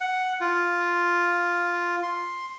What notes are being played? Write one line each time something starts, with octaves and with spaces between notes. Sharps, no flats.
F#5
F4
C6